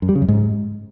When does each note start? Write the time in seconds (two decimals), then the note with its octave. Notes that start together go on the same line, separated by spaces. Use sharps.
0.02 F#2
0.09 G3
0.15 C#3
0.22 F#2
0.28 G#2